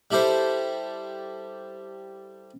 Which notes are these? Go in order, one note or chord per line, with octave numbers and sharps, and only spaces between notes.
G3 E4 G4 A4 C5